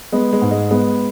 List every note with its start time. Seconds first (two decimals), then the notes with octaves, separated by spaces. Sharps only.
0.12 G#3 B3
0.33 G#3
0.41 G#2
0.51 G#3
0.71 G#3 B3